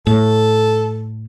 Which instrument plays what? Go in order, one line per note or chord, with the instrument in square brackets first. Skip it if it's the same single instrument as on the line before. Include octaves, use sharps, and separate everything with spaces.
[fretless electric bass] A2 [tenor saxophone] A4